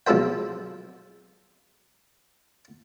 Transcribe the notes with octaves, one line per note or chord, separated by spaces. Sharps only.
B1 F3 G#3 A4 C5 G5